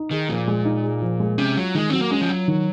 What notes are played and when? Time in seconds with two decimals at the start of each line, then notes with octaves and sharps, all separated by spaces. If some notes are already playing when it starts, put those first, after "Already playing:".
Already playing: D#4
0.11 D#3 G#4
0.29 A#2 F3
0.48 G#3
0.65 D#4
0.84 G#4
1.02 F3
1.20 G#3
1.38 C3 C#4
1.56 F#3 F4
1.74 D#3 G#3
1.90 F#3 C4
2.01 A#3
2.11 G#3 C#4
2.21 F3
2.29 F#3 F4
2.48 D#3